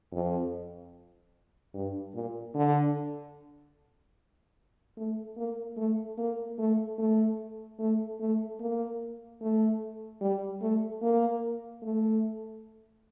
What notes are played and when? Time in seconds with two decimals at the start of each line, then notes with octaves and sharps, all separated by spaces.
0.12 F2
1.74 G2
2.14 A#2
2.55 D3
4.97 A3
5.37 A#3
5.77 A3
6.18 A#3
6.59 A3
6.98 A3
7.79 A3
8.20 A3
8.60 A#3
9.41 A3
10.22 G3
10.62 A3
11.02 A#3
11.83 A3